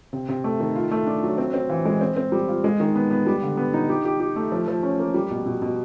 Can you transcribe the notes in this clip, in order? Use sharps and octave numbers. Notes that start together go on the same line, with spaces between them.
C3
C3
A3
D#3
F4
A3
D4
F#3
C4
C4
E3
G#3
C4
C4
G3
F4
G#3
D#3
B3
B3
G3
D3
B3
D#4
G4
G4
G4
A3
F3
F3
C#4
A#3
G3
B2
B2
B2